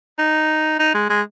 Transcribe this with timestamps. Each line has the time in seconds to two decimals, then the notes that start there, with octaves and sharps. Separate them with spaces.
0.19 D#4
0.79 D#4
0.95 G#3
1.10 G#3